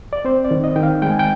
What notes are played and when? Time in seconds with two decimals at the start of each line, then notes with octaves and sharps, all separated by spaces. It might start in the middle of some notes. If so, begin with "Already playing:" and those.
0.13 D5
0.25 C4 C5
0.45 D5
0.51 D#3
0.64 D#5
0.76 D#3 G5
0.83 F5
1.02 G#3 G5
1.10 G#5
1.19 G5